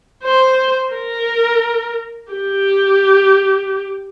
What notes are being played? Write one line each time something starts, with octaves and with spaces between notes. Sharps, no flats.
C5
A#4
G4